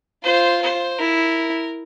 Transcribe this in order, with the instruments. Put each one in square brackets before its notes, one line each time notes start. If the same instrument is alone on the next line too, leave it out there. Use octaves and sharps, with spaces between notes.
[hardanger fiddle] F4 [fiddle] C5
[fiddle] C5
[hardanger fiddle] E4 [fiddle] A#4